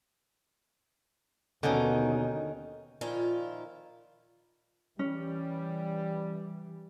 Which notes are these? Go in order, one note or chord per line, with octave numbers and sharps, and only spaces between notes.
D#2 B2 D3 D#3 C#4 D#4
A#2 D#3 F3 E4 F4
E3 G3 C#4